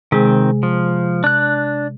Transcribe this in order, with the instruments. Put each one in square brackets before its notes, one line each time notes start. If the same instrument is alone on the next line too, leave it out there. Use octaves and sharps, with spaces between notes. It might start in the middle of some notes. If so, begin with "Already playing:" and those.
[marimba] C3 G#3 G#4 [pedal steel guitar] D#3 C4
[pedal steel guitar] F3
D4 F#6